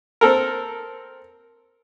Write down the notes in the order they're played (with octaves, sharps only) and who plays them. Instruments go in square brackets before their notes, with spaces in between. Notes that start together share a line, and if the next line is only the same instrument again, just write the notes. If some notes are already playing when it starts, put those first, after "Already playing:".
[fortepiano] C4 A4 A#4